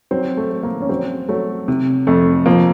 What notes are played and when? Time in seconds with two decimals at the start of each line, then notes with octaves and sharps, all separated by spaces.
0.11 F#3 C4
0.37 A3
0.51 F#3
0.63 A#3
0.82 C#4
0.89 F#3 C4
1.29 F#3 A3
1.68 C3
2.07 F2 A3
2.46 F3 A#3